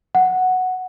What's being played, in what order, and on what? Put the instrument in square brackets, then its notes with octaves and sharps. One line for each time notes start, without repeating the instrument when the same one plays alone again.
[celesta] F#5